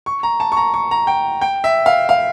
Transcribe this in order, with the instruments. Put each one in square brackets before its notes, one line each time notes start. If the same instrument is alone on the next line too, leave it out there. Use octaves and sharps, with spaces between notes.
[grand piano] C#6
A#5
A5
C#6
A#5
C#6
A#5
G5
G5
E5
F5
F5